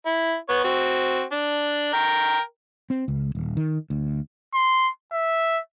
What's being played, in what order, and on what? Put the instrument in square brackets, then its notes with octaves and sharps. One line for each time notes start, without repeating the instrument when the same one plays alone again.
[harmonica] E4
B3 C#5
C4 F#4
D4
A#4 G5
[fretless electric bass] C4
C#2
D#1
D#3
D2
[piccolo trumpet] C6
E5